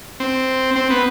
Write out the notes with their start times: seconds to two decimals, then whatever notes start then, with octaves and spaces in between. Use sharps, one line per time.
0.20 C4
0.76 C4
0.90 B3